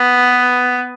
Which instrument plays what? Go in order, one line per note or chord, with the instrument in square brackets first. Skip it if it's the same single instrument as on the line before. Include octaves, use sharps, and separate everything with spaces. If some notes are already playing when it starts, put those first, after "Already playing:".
Already playing: [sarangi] B3